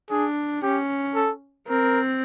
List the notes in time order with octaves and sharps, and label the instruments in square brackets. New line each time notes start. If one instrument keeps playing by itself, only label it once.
[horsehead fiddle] D4 [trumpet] G#4
[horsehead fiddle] C#4 [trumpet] G4
[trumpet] A4
[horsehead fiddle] C4 [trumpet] A#4